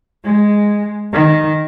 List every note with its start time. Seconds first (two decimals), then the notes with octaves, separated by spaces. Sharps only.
0.24 G#3
1.13 D#3